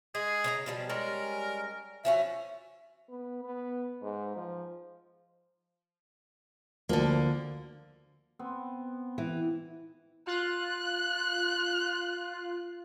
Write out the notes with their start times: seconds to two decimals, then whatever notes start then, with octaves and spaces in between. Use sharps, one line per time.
0.15 G#3 G#4
0.44 C#3 C5 A#5
0.66 B2 F3 G3
0.89 G3 G#3 C#4 A#4
2.05 F3 C#4 F#4 E5
3.09 B3
3.43 B3
4.02 G#2
4.37 F3
6.89 D2 D3 F3 A#3
8.39 B3 C4
9.18 E3
10.27 F4 F#6